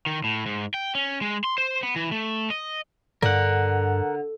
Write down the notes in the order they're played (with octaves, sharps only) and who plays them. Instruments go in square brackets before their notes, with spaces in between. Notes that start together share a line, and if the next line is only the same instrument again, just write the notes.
[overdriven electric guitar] D#3
A2
G#2
G5
C#4
G#3
C6
C5
B3
E3
A3
D#5
[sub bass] G2 [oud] D3 [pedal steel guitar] A#4 F#5